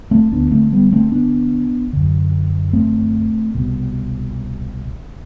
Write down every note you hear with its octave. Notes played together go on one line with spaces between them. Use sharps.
A3 C4
D2 D3 B3 D4
A3 C4
G3 B3
A3 C4
B3 D4
F#2 D3
A3 C4
C2 B2